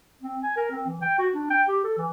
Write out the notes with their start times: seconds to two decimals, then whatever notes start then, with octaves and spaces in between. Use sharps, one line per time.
0.21 C4
0.43 G#5
0.57 A#4
0.71 C4
0.87 E3
1.02 G5
1.19 F#4
1.34 D4
1.50 G5
1.68 G4
1.84 A4
1.97 E3